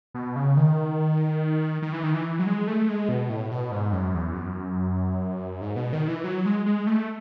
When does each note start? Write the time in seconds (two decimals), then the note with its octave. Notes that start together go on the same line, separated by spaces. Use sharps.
0.14 B2
0.36 C#3
0.57 D#3
1.82 D#3
1.93 E3
2.03 D#3
2.14 E3
2.39 F#3
2.46 G#3
2.67 A3
2.88 G#3
3.09 B2
3.29 A2
3.51 B2
3.72 G#2
3.92 F#2
4.14 E2
4.34 F#2
5.62 G#2
5.76 B2
5.93 D#3
6.08 E3
6.24 F#3
6.46 G#3
6.66 G#3
6.87 A3